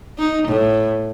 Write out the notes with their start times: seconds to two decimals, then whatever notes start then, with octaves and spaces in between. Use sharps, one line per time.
0.18 D#4
0.48 A2